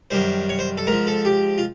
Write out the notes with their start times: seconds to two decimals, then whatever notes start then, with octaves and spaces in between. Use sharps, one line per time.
0.11 F#2 D#3 G3 C5
0.49 C#5
0.59 C5
0.77 A4
0.87 G#2 A#4
0.92 F3
1.07 A4
1.25 G4
1.58 F4